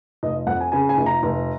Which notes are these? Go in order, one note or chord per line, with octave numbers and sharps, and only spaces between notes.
F1 D#5
F2 F#5
G#5
C#3 G#5
G#5
F1
A#5
F1